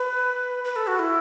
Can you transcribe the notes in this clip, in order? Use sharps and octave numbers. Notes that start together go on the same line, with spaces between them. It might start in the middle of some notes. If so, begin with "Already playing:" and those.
Already playing: B4
B4
A4
F#4
E4